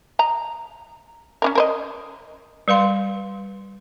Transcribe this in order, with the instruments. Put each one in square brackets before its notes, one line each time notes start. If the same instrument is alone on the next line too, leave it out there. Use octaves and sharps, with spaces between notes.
[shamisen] D#5 A#5
C#4 D4 A#4
A#4 C5 D#5
[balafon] G3 B4 F5 C6